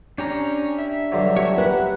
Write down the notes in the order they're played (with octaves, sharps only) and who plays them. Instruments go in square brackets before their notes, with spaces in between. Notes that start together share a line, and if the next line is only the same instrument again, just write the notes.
[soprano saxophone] C#4 [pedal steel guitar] D4 G4 A#5 [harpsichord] G5
[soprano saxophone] E5
[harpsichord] G2 D3 F#3
[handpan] G4 [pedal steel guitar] C#5
[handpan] A#4 B4 [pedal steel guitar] F#5 F#6